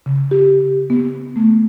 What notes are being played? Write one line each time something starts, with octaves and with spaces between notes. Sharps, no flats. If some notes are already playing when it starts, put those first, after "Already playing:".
C#3
G4
B3
A3